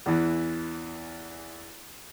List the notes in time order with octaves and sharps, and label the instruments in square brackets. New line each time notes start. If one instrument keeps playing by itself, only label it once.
[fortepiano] E2 E3